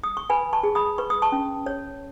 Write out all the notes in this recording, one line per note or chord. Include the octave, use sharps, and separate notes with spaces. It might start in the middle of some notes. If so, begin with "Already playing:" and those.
D#6
C#6
B4 G#5 B5
A5 C#6
G#4
B5 D#6
B4 C#6
D#6
A5 C#6
C#4
C#5